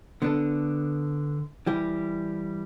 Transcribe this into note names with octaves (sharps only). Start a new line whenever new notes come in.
D3 B3 D4 A4
E3 G3 E4 G4